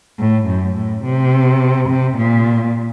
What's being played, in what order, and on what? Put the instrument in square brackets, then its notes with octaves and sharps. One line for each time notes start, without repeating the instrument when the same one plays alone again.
[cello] A2
F#2
A2
C3
C3
A#2